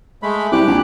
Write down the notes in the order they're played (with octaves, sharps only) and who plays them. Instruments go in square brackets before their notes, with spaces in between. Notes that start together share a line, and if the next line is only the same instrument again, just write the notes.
[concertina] G#3 A3 B5
[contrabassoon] C2 [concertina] G4 D6 F#6
[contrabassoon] A#1